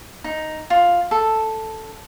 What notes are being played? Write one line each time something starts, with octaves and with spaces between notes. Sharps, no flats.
D#4
F4
A4